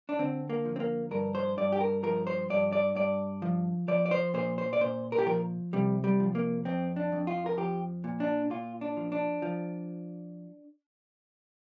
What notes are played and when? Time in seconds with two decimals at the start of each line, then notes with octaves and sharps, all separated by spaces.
0.09 D4
0.19 D3 C4
0.50 A#3
0.65 F3
0.76 C4
0.80 A#3
1.11 G2 A#4
1.35 C5
1.57 G2 D5
1.72 G4
1.81 A#4
2.03 F3 A#4
2.27 C5
2.50 G2 D5
2.72 D5
2.95 G2 D5
3.42 F3
3.88 F3 D5
4.06 D5
4.11 C5
4.34 A#2 C5
4.58 C5
4.73 D5
4.81 A#2 C5
5.12 A#4
5.18 G4
5.27 F3 A#4
5.73 C3 G3
6.04 G3
6.20 F3
6.35 A#3
6.65 F2 C4
6.96 D4
7.12 F2
7.27 F4
7.46 A#4
7.57 F3 G4
8.04 A#2
8.20 D4
8.50 A#2 F4
8.81 D4
8.97 F3
9.12 D4
9.42 F3